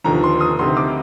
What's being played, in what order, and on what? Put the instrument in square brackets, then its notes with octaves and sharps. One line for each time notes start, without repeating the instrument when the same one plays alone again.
[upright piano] F1 D#2 D3 F3 A#5
C6
D#6
D2 C3 D#3 C6
D6